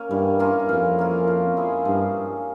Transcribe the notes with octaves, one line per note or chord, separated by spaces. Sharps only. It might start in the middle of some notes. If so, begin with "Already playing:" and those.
Already playing: A#3 C#4
G2 E3
A#3 C#4 F4
F2 E3
A#3 C#4 F4
F3
G#3 E4 G#4
G2 F3